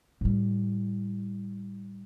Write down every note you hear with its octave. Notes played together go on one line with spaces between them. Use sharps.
A2 G3